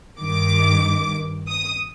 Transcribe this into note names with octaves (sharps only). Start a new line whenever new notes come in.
G2 D#3 D6
D#6